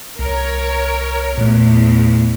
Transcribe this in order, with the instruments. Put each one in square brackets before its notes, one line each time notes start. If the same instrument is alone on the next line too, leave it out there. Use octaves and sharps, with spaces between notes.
[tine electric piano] C2 [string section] A#4 C#5
[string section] E2 [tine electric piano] A#2 A3